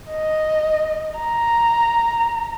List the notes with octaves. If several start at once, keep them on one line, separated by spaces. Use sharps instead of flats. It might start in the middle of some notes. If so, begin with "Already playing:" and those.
D#5
A#5